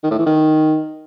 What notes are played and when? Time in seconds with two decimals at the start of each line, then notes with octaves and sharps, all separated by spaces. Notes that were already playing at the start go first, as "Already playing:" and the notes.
0.04 D#3
0.11 A2
0.19 E3
0.26 D#3